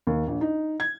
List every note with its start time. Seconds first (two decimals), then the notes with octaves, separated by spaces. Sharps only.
0.07 D#2
0.27 A#1
0.41 D#4
0.80 G#6